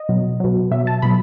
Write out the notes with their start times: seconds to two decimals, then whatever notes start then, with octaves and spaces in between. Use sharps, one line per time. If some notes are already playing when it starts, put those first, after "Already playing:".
Already playing: D#5
0.09 B2 F#3
0.40 B2 F#3
0.71 B2 F#3 E5
0.87 A5
1.02 B2 F#3 B5